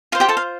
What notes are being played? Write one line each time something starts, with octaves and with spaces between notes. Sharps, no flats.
F4 C5 F5
G4 G5
A4 A5
F5